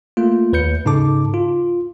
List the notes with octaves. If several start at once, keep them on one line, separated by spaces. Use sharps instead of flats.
A3 A#3 F4
D#2 B4 G6 C#7
G#2 C#3 D#4 A4 A5 D6
F4